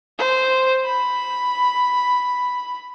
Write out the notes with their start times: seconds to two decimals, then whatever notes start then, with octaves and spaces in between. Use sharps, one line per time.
0.18 C5
0.85 B5